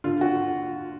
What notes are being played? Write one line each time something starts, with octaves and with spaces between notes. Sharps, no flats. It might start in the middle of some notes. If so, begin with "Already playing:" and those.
D3 F4
F#4